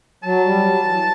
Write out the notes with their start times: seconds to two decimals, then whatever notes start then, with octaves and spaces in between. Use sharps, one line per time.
0.23 F#3 A5
0.44 G3
0.63 F#3
0.83 E3